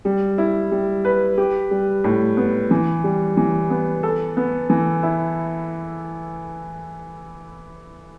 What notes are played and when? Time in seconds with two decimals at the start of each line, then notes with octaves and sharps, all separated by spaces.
0.05 G3
0.38 E4
0.72 G3
1.05 B4
1.38 G4
1.71 G3
2.04 A2
2.37 B3
2.71 E3
3.04 G3
3.37 E3
3.70 B3
4.03 A4
4.37 B3
4.70 E3
5.03 E4